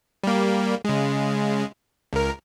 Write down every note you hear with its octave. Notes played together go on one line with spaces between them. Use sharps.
G3 A#3
C#3 G#3
C#2 A#4